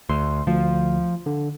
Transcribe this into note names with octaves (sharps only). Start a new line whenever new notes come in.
D2 C6
D2 F3
D3